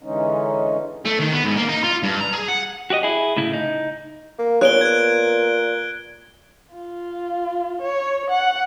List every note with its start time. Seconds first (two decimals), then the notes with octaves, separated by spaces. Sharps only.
0.03 D3 E3 G#3 C#4 D#4
1.05 A3
1.19 D#3
1.32 B3
1.44 G#2
1.57 A#3
1.69 D#4
1.84 F4
2.03 G2
2.21 A#5
2.33 G#4
2.48 F#5
2.90 F#4 G4 D5 D#5
3.03 E4 G#4
3.37 A2 C#3 E4
3.53 D#4
4.39 A#3
4.61 A#2 B3 G#4 C#5 F#6 D7 G7
4.81 F#6 G#6
6.74 F4
7.82 C#5
8.30 F#5